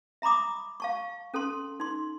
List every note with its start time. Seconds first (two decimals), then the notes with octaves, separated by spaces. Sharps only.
0.22 E5 A#5 B5 D6 D#6
0.80 F5 A5 C#6
1.34 C#4 A4 A5 C6
1.80 D#4 C6